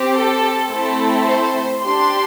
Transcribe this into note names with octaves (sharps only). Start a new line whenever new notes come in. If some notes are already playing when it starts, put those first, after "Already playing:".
Already playing: C4 G4
A4
A3 C4 E4 A4
C5
D4 G4 C6